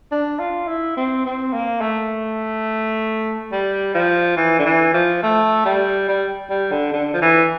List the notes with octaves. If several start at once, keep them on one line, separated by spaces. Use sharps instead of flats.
D4
F4
E4
C4
C4
A#3
A3
G3
F3
E3
D3
E3
F3
A3
G3
G3
G3
D3
D3
F3
E3